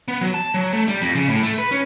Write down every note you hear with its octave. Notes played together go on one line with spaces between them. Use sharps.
B3
F#3
A5
F#3
A3
G3
F2
C#3
A2
A3
B4
C#4